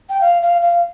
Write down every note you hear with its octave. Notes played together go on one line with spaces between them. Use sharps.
G5
F5
F5
F5